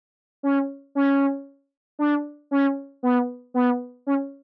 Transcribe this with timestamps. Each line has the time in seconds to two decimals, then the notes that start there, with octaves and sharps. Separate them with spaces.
0.43 C#4
0.95 C#4
1.99 D4
2.51 C#4
3.03 B3
3.54 B3
4.07 C#4